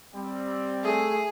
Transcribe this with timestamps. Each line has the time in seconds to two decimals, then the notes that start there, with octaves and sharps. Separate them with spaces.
0.15 G3 C4 G5
0.84 A3 G#4